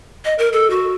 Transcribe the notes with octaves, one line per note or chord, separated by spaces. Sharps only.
D#5
A#4
A4
F#4